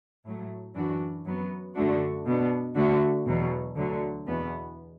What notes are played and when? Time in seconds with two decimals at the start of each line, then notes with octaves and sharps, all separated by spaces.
0.25 A2 F#3 A3
0.75 F#2 E3 D4 F#4
1.25 F#2 F#3 B3
1.75 F#2 D3 A3 D4 F#4
2.25 B2 B3 D4
2.75 D3 A3 F#4
3.26 E2 B2 F#3
3.76 D2 D3 F#3
4.26 E2 B2 B3